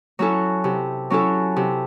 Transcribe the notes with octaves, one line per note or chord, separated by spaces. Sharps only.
F#3 C#4 E4 A4
C3
F#3 C#4 E4 A4
C3